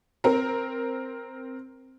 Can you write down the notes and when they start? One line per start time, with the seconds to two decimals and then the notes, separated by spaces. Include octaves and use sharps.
0.24 C4 A#4